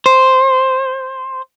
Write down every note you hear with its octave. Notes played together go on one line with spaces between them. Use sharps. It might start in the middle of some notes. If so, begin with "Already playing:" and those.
C5